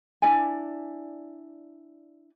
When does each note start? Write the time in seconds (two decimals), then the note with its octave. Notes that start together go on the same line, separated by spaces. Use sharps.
0.22 D4 E4 D5 G#5